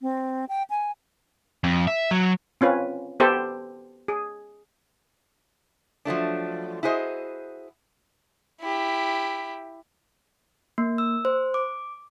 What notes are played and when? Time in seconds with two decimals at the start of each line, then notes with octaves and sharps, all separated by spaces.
0.01 C4
0.49 G5
0.70 G#5
1.64 F2
1.88 E5
2.11 F#3
2.61 C4 C#4 F4 B4
3.20 B3 G4 A4 C5 E5
4.08 G#4
6.05 F3 F#3 A3 D4
6.83 E4 F#4 G#4 C5 D#5
8.62 E4 G4
10.78 A#3
10.98 E6
11.25 C5
11.54 D6